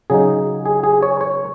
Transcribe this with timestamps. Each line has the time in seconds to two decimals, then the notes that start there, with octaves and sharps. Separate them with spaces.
0.10 C#3 F#3 D#4 G#4
0.66 G#4
0.84 G#4
1.03 C#5
1.21 C#5